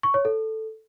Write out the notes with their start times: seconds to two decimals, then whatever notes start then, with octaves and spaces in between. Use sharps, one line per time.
0.03 C#6
0.14 C#5
0.25 A4